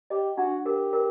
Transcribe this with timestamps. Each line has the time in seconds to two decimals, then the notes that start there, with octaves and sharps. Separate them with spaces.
0.10 G4 D#5
0.37 D4 F#4
0.65 G4 A#4
0.93 A#4